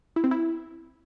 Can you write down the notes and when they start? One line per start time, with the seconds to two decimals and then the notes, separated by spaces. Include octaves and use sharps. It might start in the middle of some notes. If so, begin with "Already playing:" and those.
0.16 E4
0.24 C4
0.31 E4